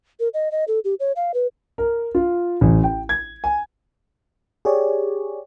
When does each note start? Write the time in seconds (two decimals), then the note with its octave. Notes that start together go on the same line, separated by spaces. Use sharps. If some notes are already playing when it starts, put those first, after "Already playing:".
0.20 A#4
0.34 D#5
0.51 D#5
0.68 A4
0.84 G4
1.00 C#5
1.16 F5
1.34 B4
1.78 A#4
2.15 F4
2.61 A1
2.84 G5
3.09 G#6
3.44 G#5
4.65 G4 G#4 C#5 D5